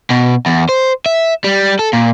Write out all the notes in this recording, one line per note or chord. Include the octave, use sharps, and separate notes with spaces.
B2
E2
C5
E5
G3
A4
A#2